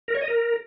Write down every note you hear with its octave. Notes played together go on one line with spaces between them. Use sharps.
A#4
C#5
D#5
A#4